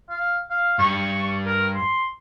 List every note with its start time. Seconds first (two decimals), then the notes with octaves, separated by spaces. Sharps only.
0.10 F5
0.51 F5
0.79 G2 C#6
1.46 A#4
1.75 C6